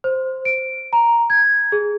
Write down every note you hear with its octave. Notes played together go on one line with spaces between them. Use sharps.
C5
D7
A#5
G#6
G#4